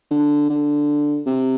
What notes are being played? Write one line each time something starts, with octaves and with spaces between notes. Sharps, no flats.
D3
D3
C3